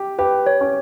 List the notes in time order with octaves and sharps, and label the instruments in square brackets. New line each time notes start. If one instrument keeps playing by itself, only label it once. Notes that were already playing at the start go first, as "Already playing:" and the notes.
Already playing: [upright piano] G4
[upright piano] G4 [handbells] B4
[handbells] C#5
[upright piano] C#4